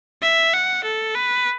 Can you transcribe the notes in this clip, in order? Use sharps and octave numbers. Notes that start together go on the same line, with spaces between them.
E5
F#5
A4
B4